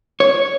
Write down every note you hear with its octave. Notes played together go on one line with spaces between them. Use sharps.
C#5